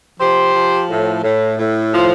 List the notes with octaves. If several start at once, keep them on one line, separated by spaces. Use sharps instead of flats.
F3 G4 C5
F3
A2
A2
A2
F3